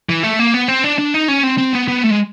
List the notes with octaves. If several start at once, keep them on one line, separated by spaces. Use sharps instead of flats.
E3
A3
A#3
B3
C4
D4
D4
D#4
C#4
C4
C4
B3
B3
A3
G#3